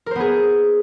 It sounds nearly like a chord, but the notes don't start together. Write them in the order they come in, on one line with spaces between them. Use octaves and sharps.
A#4 C5 B3 G#4